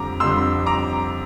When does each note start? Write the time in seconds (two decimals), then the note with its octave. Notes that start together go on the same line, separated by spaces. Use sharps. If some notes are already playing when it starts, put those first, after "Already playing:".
Already playing: F2 D3 G3 A#5 D6
0.20 F2 D3 G3 C6 E6
0.66 A#5 D6